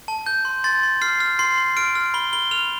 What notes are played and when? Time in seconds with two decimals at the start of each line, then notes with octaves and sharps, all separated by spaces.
0.08 A5
0.26 A5 G6
0.45 C6
0.64 C6 A6
0.83 C6
1.02 F6 C7
1.20 F6
1.39 C6 C7
1.58 C6
1.77 F6 D7
1.95 F6
2.14 B5 G7
2.33 B5 G7
2.51 F6 F7